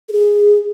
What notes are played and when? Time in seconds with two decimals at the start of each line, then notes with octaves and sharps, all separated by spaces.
0.09 A4
0.12 G#4